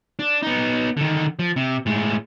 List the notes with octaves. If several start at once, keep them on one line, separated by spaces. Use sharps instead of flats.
D4
B3 D#4
D3 D#3
F3
C3
A2 G#3